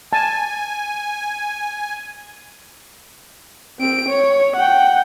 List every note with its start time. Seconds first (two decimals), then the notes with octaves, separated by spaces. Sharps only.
0.13 G#5 A5
3.80 C4 D7
4.09 C#5
4.56 F#5 G5